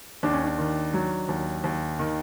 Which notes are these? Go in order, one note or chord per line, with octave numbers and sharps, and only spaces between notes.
D#2 D4
C#4
D4
D#3
F#3
D#2
D#2
D#3